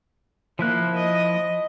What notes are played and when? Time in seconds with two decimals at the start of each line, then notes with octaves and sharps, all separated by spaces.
0.59 F3 A#3 E4 F#6
0.96 D#5